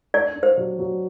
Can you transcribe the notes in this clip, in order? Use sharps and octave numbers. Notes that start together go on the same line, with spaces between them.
D4 D5
D4
C5
F#3
F#3